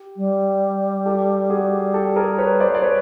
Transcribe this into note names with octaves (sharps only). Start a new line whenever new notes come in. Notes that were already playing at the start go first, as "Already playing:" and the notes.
Already playing: G4
G3
G4 A4
F#4 G#4
G4 A4
G#4 A#4
B4 C#5
C5 D5
D5
B4 C#5